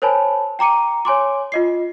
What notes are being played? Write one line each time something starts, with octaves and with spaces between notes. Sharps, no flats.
A#4 C5 C#5 G#5 A5 B5
G5 A#5 D6 C#7 D#7
C#5 G#5 C6 D6
F4 D#5 C7